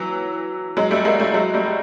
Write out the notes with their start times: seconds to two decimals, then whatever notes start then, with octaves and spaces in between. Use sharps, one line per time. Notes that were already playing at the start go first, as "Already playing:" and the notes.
Already playing: E3 F#3
0.77 F#3 G#3
0.91 G3 A3
1.05 G#3 A#3
1.20 G3 A3
1.34 F#3 G#3
1.54 G3 A3